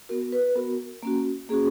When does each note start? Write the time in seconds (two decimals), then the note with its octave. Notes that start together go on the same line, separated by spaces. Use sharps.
0.09 B3 F#4 A#4
0.32 B4
0.55 B3 F#4 A#4
1.03 A#3 C#4 F#4
1.49 A#3 C#4 F#4 G#4